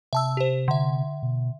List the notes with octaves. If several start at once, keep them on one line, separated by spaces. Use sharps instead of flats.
C3 E5 A5 E6
G4 C5
D3 E5
B2